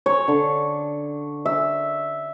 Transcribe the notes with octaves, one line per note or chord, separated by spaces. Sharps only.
C#5
D3
E5